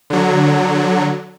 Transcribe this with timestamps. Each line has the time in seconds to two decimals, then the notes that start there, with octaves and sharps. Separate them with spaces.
0.10 D3 F#3